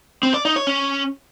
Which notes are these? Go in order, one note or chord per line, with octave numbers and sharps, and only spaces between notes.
C4
D5
D#4
C#5
C#4